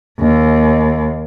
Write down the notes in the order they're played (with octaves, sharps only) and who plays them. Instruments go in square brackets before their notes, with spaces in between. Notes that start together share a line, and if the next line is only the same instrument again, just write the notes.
[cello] D#2